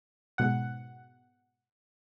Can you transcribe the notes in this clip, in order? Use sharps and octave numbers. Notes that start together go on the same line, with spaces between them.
G#2 B2 F#5